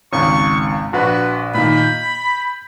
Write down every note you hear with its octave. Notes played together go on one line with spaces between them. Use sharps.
G#1 C#2 C#6
A#1 F#4 B4
A#2 D#3 B5
G6